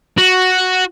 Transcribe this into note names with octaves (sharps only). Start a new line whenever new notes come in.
F#4